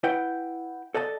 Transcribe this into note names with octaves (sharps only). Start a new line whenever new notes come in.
E4 B4 F#5 G5
A4 D5 D#5 A5